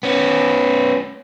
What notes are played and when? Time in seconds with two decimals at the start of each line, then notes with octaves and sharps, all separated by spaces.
0.03 B3 C#4